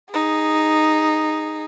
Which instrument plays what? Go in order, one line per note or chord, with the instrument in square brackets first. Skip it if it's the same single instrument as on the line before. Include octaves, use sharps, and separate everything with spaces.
[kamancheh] D#4 G#4